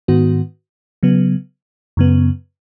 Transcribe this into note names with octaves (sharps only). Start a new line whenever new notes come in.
G#2 D#3 B3 F#4
C#3 F#3 B3
F#2 C#3 B3